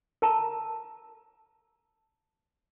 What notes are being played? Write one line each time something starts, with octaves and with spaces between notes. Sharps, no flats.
A#4 A5 A#5